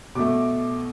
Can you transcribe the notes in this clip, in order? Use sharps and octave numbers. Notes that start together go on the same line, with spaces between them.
B2 A3 D6